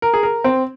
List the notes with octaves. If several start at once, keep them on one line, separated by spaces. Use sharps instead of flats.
A#4
G#4
A#4
C4